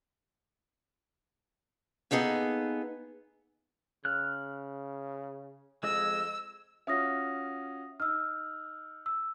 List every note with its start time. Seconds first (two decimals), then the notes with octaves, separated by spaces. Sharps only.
2.11 A#3 B3 D#4 G#4 A4
4.05 C#3 F6 F#6
5.83 F2 G#3 G#4 D#5 E6
6.87 C#4 F4 F#4 E5 D#6 A#6
8.00 D#4 E6 F6
9.06 E6